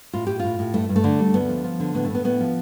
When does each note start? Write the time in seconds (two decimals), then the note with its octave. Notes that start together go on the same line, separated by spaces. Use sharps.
0.13 A2 F4
0.27 A2 G4
0.39 A2 F4
0.59 A2
0.74 G2 A3
0.89 G2
0.96 A3
1.04 D3
1.19 G3
1.34 D2 B3
1.49 F3
1.64 F3
1.80 D3
1.94 A2 B3
2.05 A3
2.10 A2 B3
2.24 A2 B3
2.40 F3